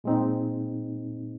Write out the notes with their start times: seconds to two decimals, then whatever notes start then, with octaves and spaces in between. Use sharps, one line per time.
0.04 A#2 G#3 C4 D#4